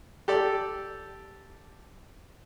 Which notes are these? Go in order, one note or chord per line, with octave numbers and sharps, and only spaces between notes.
G4 A4 D5